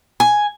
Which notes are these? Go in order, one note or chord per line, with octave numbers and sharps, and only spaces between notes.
G#5